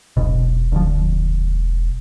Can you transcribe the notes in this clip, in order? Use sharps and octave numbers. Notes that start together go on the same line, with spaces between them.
E1 B1 F2 B2
D2 F3